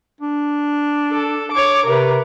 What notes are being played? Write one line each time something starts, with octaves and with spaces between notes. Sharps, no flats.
D4
A4
C#5 D6
C3 A#4 B4